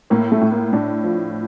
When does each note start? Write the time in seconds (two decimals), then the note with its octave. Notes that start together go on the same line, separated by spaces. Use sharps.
0.10 A2 A#3
0.32 A3
0.41 A2
0.52 A#3
0.73 A2 D4
1.04 F3